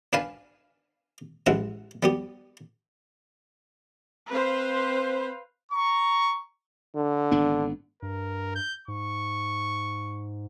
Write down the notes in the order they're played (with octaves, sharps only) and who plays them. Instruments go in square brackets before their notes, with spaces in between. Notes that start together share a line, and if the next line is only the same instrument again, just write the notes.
[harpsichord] D4 B4 F5 G#5 A5 B5
A1 G#3 E4 B4 F#5
G3 B3 G4
[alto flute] C4 [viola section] B4 C5 F5
[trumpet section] A#5 C#6
[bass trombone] D3
[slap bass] G#1 B3 D4
[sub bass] G2 [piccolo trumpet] A#4
[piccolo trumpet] G6
[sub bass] G#2 [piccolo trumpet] C#6